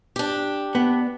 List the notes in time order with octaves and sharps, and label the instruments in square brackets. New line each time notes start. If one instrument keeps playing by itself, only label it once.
[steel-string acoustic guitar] D4 G4
[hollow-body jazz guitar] B3